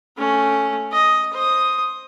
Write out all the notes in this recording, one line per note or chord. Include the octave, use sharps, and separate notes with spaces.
A3 C#4
D#5
C5 D#6